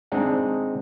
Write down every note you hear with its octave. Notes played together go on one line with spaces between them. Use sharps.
G#3 C4 D4 D#4 G#4 F#5